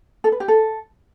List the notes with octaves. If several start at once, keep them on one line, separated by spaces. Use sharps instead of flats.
A4
B4
G4
A4